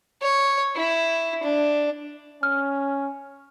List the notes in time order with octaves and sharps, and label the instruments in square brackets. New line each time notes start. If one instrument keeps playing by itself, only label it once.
[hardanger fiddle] C#5
E4
D4
[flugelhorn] C#4 [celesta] F6